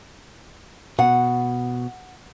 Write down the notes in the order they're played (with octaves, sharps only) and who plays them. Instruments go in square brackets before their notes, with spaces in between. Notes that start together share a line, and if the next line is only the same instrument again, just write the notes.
[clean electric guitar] B2 [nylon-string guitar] F#5